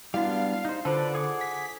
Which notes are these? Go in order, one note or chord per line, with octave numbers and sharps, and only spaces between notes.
G3 B3 D4 E4 F#4 F5
D#4 C5
D3 F4 A4 B4 C5 D5 A5
G#4 A4 F#5 D6
B6